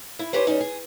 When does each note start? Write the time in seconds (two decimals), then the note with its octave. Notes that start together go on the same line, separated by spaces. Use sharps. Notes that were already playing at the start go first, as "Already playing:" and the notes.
0.19 E4
0.33 C#4 E4 G4 B4 C5
0.47 G3 C#4 D#4
0.60 G#4